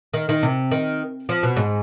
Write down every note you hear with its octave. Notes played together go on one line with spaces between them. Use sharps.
D#3
D#3
C3
D#3
F3
B2
G#2